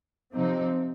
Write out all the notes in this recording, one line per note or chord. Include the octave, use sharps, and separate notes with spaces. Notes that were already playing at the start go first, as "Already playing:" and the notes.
C3 F3 C4 D#4